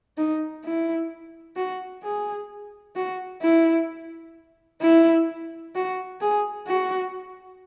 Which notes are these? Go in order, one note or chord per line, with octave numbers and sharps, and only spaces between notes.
D#4
E4
F#4
G#4
F#4
E4
E4
F#4
G#4
F#4